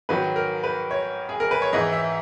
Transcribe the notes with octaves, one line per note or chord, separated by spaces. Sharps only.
G#2 D#3 F#3 B4
A#4
B4
C#5
G#4
A#4
B4
C#5
G#2 E3 D#5
E5